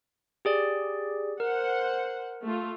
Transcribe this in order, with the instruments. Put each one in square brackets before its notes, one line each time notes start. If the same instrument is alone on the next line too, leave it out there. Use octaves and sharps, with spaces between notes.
[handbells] G4 G#4 D5
[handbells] A#4 [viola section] C5 F#5
[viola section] A3 F4